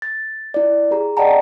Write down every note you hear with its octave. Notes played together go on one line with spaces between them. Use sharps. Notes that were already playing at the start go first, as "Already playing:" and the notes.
A6
E4 D5
G4 G#4 A#5
D5 D#5 F#5 G5 A5 A#5